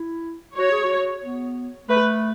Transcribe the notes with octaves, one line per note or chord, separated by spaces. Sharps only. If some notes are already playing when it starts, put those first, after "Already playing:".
Already playing: E4
F#4 C#5
G#4
F#4
B3
A3 B4